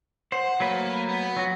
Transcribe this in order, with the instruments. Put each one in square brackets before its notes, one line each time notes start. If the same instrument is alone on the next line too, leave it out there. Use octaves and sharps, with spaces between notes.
[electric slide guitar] C5 [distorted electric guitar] F#5
[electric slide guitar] F#3 A3 B4 [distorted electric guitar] A#3
[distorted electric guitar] B3
[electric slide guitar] F#3 F#4